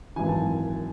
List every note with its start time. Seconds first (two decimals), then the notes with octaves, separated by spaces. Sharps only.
0.16 G#1 F#2 E3 G#5
0.28 A5